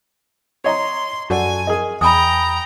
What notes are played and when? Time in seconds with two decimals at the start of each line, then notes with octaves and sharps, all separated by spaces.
0.64 C#5 D#5 A#5 C6
1.30 F#2 F#4 A4 D5 G#5
1.67 G#4 A#4 D#5
2.01 E2 G5 G#5 A#5 B5 D#6